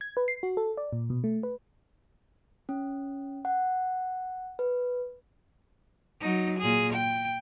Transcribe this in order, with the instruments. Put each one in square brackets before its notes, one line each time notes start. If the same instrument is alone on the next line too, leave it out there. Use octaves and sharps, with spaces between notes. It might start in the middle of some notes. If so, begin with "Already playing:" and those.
[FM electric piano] G#6
B4
C7
F#4
A4
D5
A#2
B2
A3
B4
[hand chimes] C#4
F#5
B4
[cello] F#3 D#4
A#2 G#4
G5